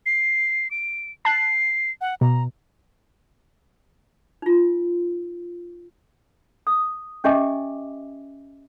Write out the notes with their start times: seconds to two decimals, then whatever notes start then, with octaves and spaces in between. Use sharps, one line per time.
0.06 C7
0.71 D7
1.25 A5 F#6 C7
2.01 F#5
2.21 B2 A#5
4.42 D#4 F4
6.67 D#6
7.24 C#4 G4 D#5 E5 G#5 D6